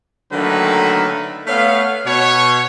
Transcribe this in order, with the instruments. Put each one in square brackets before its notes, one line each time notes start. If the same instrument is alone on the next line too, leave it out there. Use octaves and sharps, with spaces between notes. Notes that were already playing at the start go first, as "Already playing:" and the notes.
[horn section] D3 D#3 F#3 A3 A#3 B4
A3 B3 C#5 F5
B2 C#5